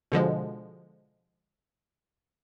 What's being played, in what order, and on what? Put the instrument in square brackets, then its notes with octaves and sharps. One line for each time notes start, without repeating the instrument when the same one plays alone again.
[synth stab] B2 D3 F3 G#3